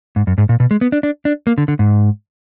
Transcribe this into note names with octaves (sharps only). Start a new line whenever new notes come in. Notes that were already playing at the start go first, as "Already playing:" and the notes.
G#2
F#2
G#2
A#2
B2
G#3
B3
D4
D4
D4
A#3
D3
D3
G#2